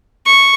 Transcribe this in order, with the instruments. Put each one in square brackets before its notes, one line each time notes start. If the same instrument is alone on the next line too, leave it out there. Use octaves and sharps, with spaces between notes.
[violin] C#6